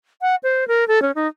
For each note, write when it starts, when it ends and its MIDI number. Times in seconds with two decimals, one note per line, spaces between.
0.22 0.35 78
0.43 0.67 72
0.68 0.87 70
0.88 1.01 69
1.02 1.11 61
1.15 1.27 63